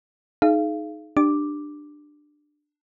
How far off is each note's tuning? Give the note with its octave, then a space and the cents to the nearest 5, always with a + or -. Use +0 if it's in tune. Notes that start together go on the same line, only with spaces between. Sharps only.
D#4 +0 G#4 +30 F5 -30
D4 +15 G4 +0 D6 +0